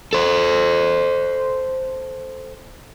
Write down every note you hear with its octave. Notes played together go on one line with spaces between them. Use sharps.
A4 C5